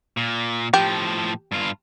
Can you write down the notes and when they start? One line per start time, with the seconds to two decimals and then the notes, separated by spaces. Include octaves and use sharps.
0.17 A#2
0.74 A2 F3 G4
1.52 G2 F4